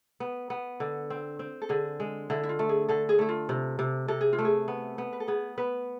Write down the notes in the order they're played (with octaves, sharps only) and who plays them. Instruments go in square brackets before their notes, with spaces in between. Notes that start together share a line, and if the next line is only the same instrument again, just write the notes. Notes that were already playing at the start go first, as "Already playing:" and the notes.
[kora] B3
B3
D3
C4
C4
[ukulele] A4
[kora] D3 [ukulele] G#4
[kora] G#3
[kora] D3 [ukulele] E4
[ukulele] E4
F4
[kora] A3
[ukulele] G#4
[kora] D3 [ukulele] A4
[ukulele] G#4
[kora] A3 [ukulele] E4
[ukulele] F4
[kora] C3
C3
[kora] C3 [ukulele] A4
[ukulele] G#4
F4
[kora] A3
[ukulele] G#4
[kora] B3
B3
[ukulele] B4
A4
[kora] B3 [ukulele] G#4
[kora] B3 [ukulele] B4